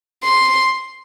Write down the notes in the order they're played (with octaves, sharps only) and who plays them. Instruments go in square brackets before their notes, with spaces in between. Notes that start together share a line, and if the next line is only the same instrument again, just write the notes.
[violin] C6